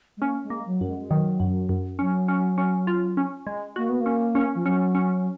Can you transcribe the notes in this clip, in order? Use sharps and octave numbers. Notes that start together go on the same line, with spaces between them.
G#3
A#3 C#4
G#3
A#3
F#3
F#2
G#3
G#3
D#3 F#3
F#2
F#2
F#3 C#4
C#4
C#4
F4
C#4
G#3
A#3 F#4
B3
A#3
C#4
C#4
F3
F#3 C#4
C#4